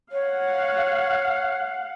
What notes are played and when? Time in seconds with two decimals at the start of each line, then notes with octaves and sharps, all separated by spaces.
0.12 C#5 F5 F#5